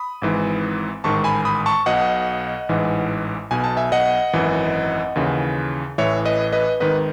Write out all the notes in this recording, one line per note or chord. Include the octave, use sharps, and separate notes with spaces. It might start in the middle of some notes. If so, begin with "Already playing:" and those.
Already playing: B5 D#6
G#1 G#2 E3
A1 G#2 D#3 A5 C#6
G#5 B5
B5 D#6
A5 C#6
B1 B2 D#5 F#5
A1 G#2 E3
B1 B2 G#5
A5
E5 G#5
D#5 F#5
G#1 F#2 E3
D#2 C#3 E3
A1 A2 E3 C#5 E5
B4 D#5
B4 D#5
G#1 G#2 D#3 B4 D#5